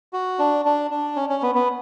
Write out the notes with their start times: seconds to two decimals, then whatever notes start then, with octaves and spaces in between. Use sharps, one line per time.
0.13 F#4
0.39 D4
0.65 D4
0.91 D4
1.16 C#4
1.29 C#4
1.43 B3
1.55 B3